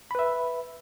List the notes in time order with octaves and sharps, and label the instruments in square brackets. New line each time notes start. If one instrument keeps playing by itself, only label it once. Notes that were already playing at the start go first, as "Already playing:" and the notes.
[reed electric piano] B5
B4
E5